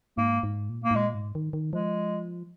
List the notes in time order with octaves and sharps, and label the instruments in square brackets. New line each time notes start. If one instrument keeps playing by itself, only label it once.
[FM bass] G#2 [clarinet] A#3
[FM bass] G#2
A#2
[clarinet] A#3
[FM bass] G#2
[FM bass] A#2 [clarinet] G#3
[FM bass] G#2
D#3
D#3
[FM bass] F3 [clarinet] G#3